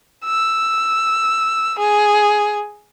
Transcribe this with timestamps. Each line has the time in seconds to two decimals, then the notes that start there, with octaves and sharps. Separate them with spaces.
0.25 E6
1.79 G#4